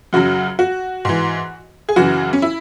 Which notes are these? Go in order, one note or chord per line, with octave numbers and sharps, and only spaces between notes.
F#2 C#3 F#3 F#4
F#4
G#2 E3
G#4
F#2 C#3 E3 F#4
C#4
E4